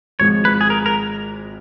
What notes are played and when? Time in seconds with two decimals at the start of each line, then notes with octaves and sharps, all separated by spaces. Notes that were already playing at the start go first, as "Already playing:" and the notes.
0.20 G#1 G#2 F3 C#5
0.45 B4
0.61 G#4
0.70 A#4
0.86 A#4